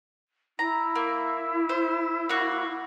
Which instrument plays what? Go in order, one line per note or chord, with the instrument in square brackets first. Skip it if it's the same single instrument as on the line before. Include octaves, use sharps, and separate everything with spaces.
[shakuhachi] E4 [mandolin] A#5
[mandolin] A#3
C5
A#3 F#4